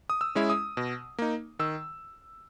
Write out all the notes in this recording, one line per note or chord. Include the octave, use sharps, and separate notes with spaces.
D#6
E6
G#3 C#4 E4
D#6
B2
A#3 D#4
D#3 E6